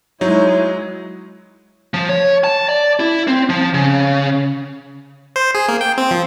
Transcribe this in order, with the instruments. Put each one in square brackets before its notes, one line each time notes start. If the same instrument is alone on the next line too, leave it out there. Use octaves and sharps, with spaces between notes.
[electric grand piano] F#3 D#4 [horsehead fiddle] G#3 E4 [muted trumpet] C#5
[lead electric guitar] F3
C#5
A5
D5
E4
C4
F3
C#3
[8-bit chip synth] C5
G#4
A#3
G5
C4
F3